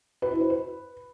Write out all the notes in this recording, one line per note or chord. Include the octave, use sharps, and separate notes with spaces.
B4
E4
C5
B4